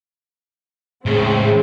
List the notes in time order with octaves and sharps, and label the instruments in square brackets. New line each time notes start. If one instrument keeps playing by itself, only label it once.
[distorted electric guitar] A2 C#3 [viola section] G#3 C4 G#4